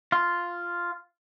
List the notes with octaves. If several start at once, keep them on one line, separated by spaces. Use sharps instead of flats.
F4